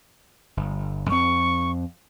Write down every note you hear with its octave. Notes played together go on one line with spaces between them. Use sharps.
G1
F2 C4 C#6